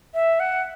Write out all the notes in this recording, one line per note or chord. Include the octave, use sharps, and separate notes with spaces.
E5
F#5